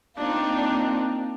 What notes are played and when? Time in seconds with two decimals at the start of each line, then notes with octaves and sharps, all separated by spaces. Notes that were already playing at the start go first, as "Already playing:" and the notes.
0.16 A#3 C4 D4 D#4 F4